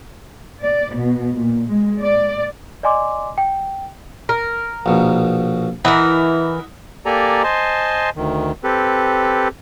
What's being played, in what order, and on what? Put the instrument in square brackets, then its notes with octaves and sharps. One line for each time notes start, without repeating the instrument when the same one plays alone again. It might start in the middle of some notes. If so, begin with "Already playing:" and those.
[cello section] D5
B2
A#2
G#3
D5
[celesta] D5 D#5 G#5 C6 D6
G5
[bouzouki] A#4
[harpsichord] A#1 B2
[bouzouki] E3 A#4 [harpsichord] D#5 E5 F#5
[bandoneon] A#3 G4 A4 D5 G#5 A#5
C5 D#5 G#5 A5 C6
D2 D#3
C4 G4 A4 B4